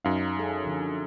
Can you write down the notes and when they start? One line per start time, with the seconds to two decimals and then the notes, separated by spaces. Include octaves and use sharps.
0.05 F#2 D#4 F5
0.39 C#4 G#4 A4
0.64 D3 F3